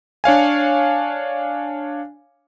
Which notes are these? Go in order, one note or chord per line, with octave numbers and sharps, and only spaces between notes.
D4 C#5 F5 G#5